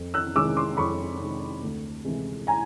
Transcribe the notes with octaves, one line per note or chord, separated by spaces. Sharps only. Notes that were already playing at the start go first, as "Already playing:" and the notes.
Already playing: F2
E6 F#6
C3 D#3 G#3 D6 E6
C6 D6
F2 B5 C#6
C3 D#3 G#3
D2
C3 E3 G#3
G#5 A#5